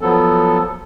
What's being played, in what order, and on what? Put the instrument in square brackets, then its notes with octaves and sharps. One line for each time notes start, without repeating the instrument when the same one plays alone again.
[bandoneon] F3 F#3 B3 A4